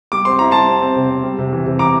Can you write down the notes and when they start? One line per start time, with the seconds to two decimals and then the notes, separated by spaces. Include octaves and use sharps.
0.12 G3 D6
0.25 C4 C6
0.39 E4 A#5
0.51 G3 A5 C6
0.67 C4
0.82 C4
0.96 C3
1.10 C4
1.24 G3
1.38 C3
1.52 E3
1.66 C3
1.79 E3 A#5 D6